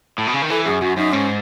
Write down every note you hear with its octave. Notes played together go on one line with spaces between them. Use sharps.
A2
B2
C#3
D#3
E3 A4
F#2 G#4
F#2 F#4
F#2 D#4
G#2 C#4